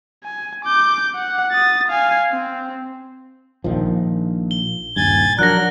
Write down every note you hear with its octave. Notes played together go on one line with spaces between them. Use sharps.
G#5
D6 G6
F#5
D#6 A6
F5 G#5
C4
A#1 D#3 F3
G7
D#1 G2 G#5 G#6 A6
F3 F#3 D4 A#4 F#5 F#6 A#6